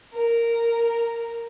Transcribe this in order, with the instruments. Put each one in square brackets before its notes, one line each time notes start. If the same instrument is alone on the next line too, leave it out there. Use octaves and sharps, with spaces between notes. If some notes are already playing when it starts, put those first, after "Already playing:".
[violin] A#4